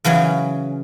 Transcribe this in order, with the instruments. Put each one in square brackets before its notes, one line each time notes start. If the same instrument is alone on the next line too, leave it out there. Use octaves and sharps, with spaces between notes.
[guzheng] C#3 E3 F#3 C#4